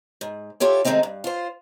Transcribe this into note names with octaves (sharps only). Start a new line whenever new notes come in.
G#2
E4 F4 G4 A4 C#5
D#3 E3 G#3 A3 C4 D#4
G2
F4 C5